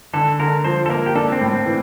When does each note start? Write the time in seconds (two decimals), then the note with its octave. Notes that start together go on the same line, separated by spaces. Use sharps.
0.13 D3 A4
0.40 D3 A#4
0.64 F3 C5
0.86 A4
0.89 A#3 A#4
1.06 G4
1.15 D4 A4
1.32 C4
1.41 A2
1.49 C4
1.66 E3